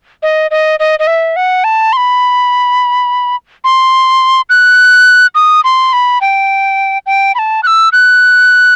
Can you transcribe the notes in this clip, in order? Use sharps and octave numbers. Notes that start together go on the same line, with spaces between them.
D#5
D#5
D#5
D#5
E5
F#5
A5
C6
B5
C6
F#6
D#6
C6
B5
G5
G5
B5
A5
F#6
E6
F#6